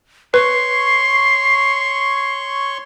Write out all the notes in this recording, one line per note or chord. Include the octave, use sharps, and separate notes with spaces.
B4 C#5 C6 C#6 C7